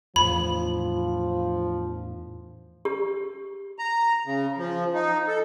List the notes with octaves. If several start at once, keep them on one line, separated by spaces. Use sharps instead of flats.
E2 A2 F3 B5
G4
A#5
C#3
F3
D#4
A4